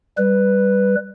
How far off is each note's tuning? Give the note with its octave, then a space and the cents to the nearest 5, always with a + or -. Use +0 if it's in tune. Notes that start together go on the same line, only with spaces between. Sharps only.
G3 +0 B4 +0